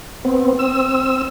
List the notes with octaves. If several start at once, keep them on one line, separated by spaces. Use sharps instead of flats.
B3 C4
C4 E6